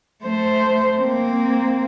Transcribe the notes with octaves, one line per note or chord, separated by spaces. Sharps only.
A3 C5
A#3 C4